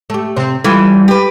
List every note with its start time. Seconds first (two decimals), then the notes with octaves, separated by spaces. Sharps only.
0.10 A3 G4
0.36 C3 C4 C5
0.64 E3 G3 F4 A4
1.08 G4 B4